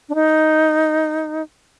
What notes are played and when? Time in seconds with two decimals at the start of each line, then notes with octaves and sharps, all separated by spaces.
0.09 D4
0.15 D#4